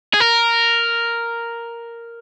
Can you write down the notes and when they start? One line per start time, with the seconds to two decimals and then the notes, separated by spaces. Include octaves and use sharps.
0.14 G#4
0.20 A#4